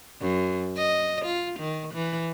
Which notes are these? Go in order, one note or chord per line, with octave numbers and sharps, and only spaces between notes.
F#2
D#5
F4
D#3
E3